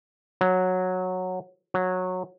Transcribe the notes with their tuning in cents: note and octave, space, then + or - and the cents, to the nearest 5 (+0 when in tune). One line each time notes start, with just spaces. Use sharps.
F#3 -10
F#3 -15